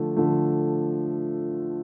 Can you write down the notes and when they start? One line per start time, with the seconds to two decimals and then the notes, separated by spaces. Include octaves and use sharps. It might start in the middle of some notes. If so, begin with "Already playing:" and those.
Already playing: D3 F3 A3
0.16 D3 F3 A3